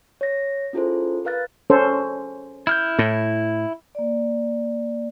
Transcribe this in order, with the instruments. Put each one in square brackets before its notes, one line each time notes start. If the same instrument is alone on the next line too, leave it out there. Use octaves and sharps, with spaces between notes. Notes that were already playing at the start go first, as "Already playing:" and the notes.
[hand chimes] C#5 A#6
C#4 E4 F4 G#4 A4 C5
A#4 B4 F5 F#6 A6
[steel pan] C#4 A4 C5
[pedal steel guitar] E4 F6 G6
[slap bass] A2
[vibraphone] A#3 D5